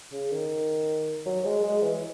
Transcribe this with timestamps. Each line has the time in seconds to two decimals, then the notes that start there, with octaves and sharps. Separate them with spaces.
0.12 C#3
0.32 D#3
1.26 F#3
1.45 G#3
1.63 G#3
1.82 E3